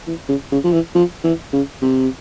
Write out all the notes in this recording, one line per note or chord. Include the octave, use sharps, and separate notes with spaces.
E3
C#3
C#3
F3
E3
F3
E3
C#3
C3